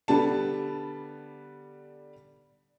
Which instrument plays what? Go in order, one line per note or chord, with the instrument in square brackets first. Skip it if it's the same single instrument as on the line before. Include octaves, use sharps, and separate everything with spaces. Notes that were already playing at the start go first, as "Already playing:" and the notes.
[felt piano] D3 G3 B3 A5